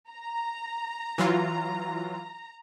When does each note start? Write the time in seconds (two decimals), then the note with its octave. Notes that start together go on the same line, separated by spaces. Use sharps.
0.11 A#5
1.18 E3 F#3 F4